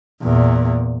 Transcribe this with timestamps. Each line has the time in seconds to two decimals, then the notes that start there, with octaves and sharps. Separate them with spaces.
0.22 E2 A#2